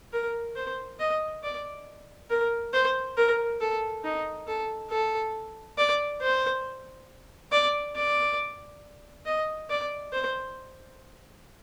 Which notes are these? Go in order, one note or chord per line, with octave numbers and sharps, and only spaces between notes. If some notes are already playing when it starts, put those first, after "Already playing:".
A#4
C5
D#5
D5
A#4
C5
A#4
A4
D#4
A4
A4
D5
C5
D5
D5
D#5
D5
C5